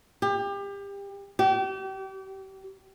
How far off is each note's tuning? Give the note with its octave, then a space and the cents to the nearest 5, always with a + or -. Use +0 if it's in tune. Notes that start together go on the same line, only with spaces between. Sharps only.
G4 +30
G4 -35